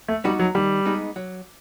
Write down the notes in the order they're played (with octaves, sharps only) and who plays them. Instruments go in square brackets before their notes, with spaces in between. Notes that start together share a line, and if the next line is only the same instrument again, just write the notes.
[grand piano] A3
[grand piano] G3 [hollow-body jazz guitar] B3 D#4 F#4
[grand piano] F#3
[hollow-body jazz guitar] D#3 [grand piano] G3
[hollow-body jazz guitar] G#3 B3 D#4
F#3